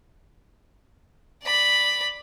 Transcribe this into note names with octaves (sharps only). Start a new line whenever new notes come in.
D5 B5